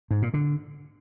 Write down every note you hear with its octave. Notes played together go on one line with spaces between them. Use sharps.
G#2
A#2
D3